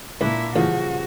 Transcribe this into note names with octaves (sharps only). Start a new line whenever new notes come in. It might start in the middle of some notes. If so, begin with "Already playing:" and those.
C#2 A#2 D4 E4
A1 G2 C#3 F3 F#4